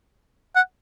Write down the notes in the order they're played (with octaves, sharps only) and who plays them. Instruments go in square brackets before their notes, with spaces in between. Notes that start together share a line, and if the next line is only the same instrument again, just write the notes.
[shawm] F#5